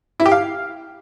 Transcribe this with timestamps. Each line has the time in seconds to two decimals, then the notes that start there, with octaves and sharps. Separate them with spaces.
0.20 E4
0.26 G4
0.32 F5